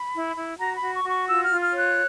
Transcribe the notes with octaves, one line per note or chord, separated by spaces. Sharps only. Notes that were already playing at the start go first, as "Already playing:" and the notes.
Already playing: B5
E4
E4
F#4 A#5
B5
F#4
C#6
F#4
C#6
F4 E6
F6
F4
F6
C#5
F#6